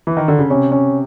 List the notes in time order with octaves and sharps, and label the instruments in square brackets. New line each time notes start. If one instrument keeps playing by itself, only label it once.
[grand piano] E3
D#3
D3
C#3
[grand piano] C3 [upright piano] C#4
[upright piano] C#4